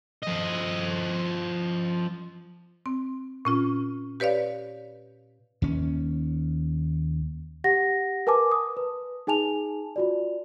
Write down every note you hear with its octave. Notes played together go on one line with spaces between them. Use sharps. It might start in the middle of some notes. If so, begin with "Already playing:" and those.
F3 D#5
C4
A#2 C#4 F4
G4 B4 C#5 D5 F5
D#2 C#4
G4 F#5 A#6
A#4 B4 G#5 A5 D6
D#6
B4
D#4 G#4 G#5 A5 F7
F4 F#4 D5